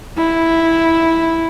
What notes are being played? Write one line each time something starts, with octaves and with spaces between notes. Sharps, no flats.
E4